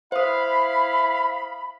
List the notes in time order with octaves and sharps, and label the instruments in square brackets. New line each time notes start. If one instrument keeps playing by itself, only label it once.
[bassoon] E4 [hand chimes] C5 D#6 [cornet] F5 [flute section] B5